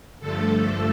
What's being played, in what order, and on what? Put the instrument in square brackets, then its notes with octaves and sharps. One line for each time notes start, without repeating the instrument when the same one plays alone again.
[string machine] G2 D3 F3 A3 A4